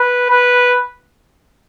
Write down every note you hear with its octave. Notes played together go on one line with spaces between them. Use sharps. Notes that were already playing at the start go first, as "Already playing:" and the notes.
Already playing: B4
B4